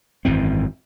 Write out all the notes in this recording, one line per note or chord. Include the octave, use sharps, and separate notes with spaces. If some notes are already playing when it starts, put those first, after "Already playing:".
G#1 F#2 E3 C4